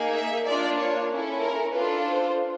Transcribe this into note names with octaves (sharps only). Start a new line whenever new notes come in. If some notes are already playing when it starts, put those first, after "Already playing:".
Already playing: A#3 D#4 G#4
E5
A#3 D4 F4 D5
C#5
C#4 E4 A4
A#4
D4 F4 A4 B4
C5